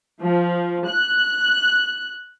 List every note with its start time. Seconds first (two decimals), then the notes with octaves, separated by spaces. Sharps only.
0.20 F3
0.87 F#6